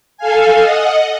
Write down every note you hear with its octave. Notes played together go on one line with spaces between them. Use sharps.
A4 F5 G#5
D#5 F#5